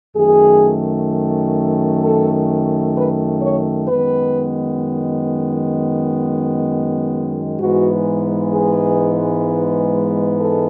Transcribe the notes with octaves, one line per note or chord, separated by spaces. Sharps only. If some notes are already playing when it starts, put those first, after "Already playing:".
F#2 D#3 A3 G#4
A4
B4
C#5
F#2 D#3 G#3 B3 B4
G#2 E3 G#3 B3 F#4
G#4
A4